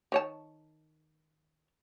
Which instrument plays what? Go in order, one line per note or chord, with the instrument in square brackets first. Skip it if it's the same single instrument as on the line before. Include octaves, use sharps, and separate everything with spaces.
[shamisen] D#3 C#5 A5